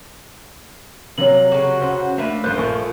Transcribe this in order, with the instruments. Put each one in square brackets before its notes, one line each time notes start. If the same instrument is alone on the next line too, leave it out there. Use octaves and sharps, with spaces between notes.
[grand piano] C3 F#3 A#3 [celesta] C#5 F#7
[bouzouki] C#3 F#4
[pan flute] C#4 [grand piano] C5 F#5
[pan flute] A3 [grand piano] A#3 D4 [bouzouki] B4 E5
[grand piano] A1 G2 [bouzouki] A3 F4 C5 [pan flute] A#4 [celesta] F#6
[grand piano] A#1 G#5 C#6